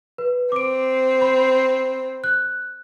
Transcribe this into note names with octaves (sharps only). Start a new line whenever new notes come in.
B4
C4 D6 D7
B5
F#6